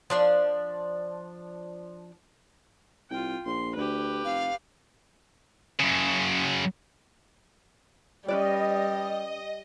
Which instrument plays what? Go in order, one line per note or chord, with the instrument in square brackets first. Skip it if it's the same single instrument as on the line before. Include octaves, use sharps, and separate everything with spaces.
[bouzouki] F3 D4 D5
[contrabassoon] C2 [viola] F4 G5
[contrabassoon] A#1 [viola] C6
[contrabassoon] D2 [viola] G4 B4
[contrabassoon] F1 [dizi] F5
[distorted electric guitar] F#2 C#3
[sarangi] G3 [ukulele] C#4 B4 D5 [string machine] D#5